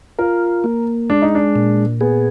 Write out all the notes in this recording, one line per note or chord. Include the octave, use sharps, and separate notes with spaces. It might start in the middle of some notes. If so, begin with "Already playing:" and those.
F4 A#4
A#3
G#3 D4
D#4
D4
A#2
B3 G#4